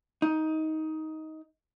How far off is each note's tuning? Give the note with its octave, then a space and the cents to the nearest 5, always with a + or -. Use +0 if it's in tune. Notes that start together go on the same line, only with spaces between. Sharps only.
D#4 +15